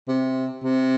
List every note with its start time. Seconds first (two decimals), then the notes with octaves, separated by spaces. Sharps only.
0.08 C3
0.63 C3